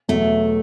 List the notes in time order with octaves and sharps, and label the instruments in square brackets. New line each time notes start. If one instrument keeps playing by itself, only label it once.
[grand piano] E2 B2 F#3 [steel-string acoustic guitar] A3